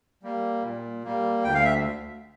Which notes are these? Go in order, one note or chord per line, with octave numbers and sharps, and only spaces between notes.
G3 A#3
A#2
G3 A#3
D2 G5
F5
E5